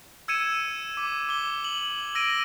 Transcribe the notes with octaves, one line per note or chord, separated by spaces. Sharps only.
E6 G#6 C#7 D#7 E7
D6
D6 G7
F#7
E6 A#6 D7 D#7